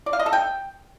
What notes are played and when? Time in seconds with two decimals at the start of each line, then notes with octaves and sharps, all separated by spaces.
0.06 D5
0.13 F5
0.19 D#5
0.26 A4
0.33 G5